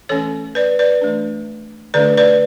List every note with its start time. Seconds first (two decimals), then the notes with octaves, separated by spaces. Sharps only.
0.09 E3 A3 C#4 A4 C#5
0.55 B4 D5
0.79 B4 D5
1.01 E3 A3 D4
1.94 D3 A3 D4 B4 D5
2.18 B4 D5